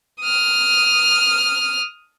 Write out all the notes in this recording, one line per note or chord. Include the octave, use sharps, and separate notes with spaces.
D#6 F6